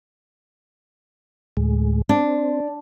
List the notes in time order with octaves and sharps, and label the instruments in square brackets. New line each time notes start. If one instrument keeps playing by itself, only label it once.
[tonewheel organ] D2 A2 G#3
[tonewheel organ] C4 [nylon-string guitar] D4